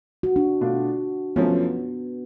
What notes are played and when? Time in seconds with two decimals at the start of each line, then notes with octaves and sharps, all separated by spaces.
0.23 F#4
0.36 D4
0.61 B2 A3 D4 F4
1.36 F#2 F3 A3 B3 C#4